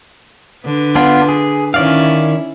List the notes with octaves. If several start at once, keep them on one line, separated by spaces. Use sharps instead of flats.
D3 B4
B3 D4 F4
G#4
D#3 C#4 E4 D5 F5